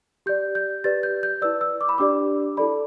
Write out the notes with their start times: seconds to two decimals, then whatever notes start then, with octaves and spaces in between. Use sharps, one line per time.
0.26 G4 D5 G6
0.55 G6
0.84 G4 B4 D5 A6
1.03 G6
1.23 G6
1.42 E4 B4 D5 E6
1.61 E6
1.81 D6
1.89 B5
1.98 D4 G4 D5 D6
2.57 E4 A4 D5 B5